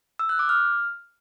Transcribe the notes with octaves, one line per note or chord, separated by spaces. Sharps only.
E6
F#6
D6
F6